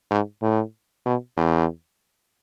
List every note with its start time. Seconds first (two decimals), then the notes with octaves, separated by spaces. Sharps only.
0.11 G#2
0.42 A2
1.06 B2
1.37 E2